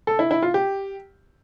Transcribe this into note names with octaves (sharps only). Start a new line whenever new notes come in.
A4
E4
E4
F4
G4